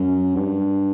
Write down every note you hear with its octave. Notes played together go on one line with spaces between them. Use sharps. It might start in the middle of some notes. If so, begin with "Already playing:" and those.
Already playing: F#2
G2